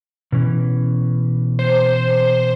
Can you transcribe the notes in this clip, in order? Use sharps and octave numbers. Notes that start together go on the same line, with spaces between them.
B2 E3 C#4
C5